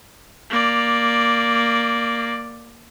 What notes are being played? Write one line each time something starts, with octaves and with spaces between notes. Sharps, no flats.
A#3 D5